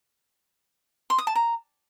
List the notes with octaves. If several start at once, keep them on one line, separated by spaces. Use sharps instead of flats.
C6
D#6
A5
A#5